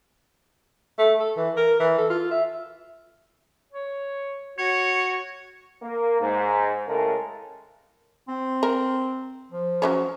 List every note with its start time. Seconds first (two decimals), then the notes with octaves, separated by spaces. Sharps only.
0.99 A3
1.20 A4
1.37 E3
1.57 A#4
1.80 E3
1.98 A4
2.10 F4
2.31 E5
3.72 C#5
4.58 F#4 C#5
5.82 A#3
6.21 G#2
6.88 A2 C#3 G#3 A4 A#4
8.28 C4
8.63 A#4
9.52 F3
9.82 F#3 C#4 C#5